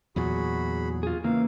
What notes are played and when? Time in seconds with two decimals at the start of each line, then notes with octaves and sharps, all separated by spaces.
0.16 E2 A#2 F#3 F#4 G#4 B5
1.03 F4 G#4
1.24 C#3 E3 A#3 F5